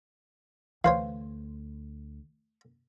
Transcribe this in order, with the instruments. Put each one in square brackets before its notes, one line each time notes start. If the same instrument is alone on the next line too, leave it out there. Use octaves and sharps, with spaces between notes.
[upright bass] D2 [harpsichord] E3 C5 C#5 [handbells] F5